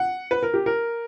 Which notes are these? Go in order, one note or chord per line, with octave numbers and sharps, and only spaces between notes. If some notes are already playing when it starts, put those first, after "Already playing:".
Already playing: F#5
B4
A#4
G4
A#4